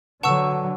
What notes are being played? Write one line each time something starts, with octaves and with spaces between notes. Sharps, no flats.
D3 F#3 B4 F#5 A5 C#6 E6